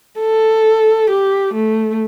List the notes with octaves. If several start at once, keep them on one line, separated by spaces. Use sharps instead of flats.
A4
G4
A3